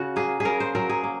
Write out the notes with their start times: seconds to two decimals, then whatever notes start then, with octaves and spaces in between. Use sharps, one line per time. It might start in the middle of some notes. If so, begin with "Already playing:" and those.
Already playing: C#3 F#4
0.16 A#3 G#4
0.40 G#4
0.45 C#3 A#4
0.60 C5
0.75 F#3 A#4
0.90 G#4
1.04 A#3